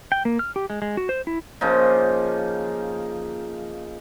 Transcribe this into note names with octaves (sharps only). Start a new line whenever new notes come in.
G5
A#3
F6
G4
G#3
G#3
F#4
C5
E4
C#3 F3 A#3 D#4